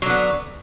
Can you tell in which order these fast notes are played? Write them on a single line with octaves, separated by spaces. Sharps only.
F#3 D3 B3